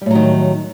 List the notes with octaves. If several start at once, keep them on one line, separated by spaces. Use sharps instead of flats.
A2 D#3 F#3 G3